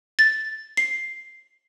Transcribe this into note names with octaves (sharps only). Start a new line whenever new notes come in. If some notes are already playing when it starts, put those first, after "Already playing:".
A6
C7